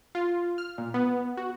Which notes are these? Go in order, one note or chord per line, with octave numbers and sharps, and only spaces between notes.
F4
F6
A#2
B3
F#4